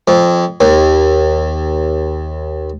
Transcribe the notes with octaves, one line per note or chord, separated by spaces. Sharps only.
F2
D#2